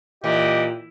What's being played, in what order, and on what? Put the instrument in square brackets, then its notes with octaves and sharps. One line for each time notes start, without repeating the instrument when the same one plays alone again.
[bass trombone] A#2 [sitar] E3 [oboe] G4 [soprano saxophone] D#5